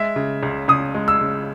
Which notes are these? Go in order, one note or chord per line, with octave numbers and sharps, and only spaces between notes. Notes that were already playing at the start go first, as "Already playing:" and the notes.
Already playing: G#3 E5
C#3
C#2
C#2 D#6
G#3
E6
C#3